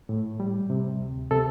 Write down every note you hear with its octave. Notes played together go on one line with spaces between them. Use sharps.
A2
G3
C3
D2
C3 A4